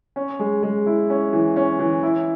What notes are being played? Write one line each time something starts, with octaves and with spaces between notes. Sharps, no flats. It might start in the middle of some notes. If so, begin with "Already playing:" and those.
C#4
G#3
G#3
E4
C#4
E3
C#4
E3
E4